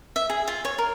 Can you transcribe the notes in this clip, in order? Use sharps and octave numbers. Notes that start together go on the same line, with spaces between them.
E5
G#4
F4
C#5
A#4